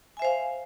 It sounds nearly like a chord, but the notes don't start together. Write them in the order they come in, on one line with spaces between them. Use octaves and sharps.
G#5 E5 C5 F5